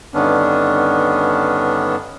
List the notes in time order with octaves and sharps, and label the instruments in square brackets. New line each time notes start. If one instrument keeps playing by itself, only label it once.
[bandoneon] G2 D3 D#3 B3 C#4 D4